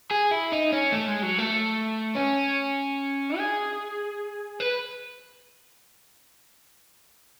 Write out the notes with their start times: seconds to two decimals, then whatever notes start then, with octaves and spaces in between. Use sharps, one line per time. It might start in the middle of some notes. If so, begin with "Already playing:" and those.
0.11 G#4
0.32 E4
0.52 D#4
0.72 C#4
0.92 A3
1.08 G#3
1.23 F#3
1.39 A3
2.15 C#4
3.38 G#4
4.60 B4